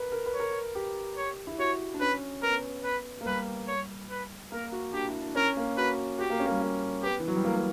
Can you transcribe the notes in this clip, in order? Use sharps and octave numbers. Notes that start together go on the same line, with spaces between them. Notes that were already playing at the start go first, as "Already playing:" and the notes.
Already playing: A#4 B4
A#4
B4
C#5
A#4
G4
C#5
E4
F#4 C#5
D4
C#4 B4
B3 A#4
B4
A#3
G3 B4
C#5
B4
A#3 A#4
F#4
D4 G4
E4
D4
C#4 A#4
A#3
F#4 B4
F#4 G4
A#3
C#4
A#3
G3
A#3
B3 G4
E3
F#3
G3
A#3
A#3